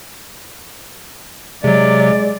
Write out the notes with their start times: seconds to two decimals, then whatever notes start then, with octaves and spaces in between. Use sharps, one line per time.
1.64 C3 F#3 G#3 D5